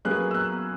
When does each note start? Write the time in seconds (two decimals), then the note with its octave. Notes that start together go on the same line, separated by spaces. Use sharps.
0.05 F#3 A#3 C#4 G#4 B4 F#6
0.31 E6
0.34 F#6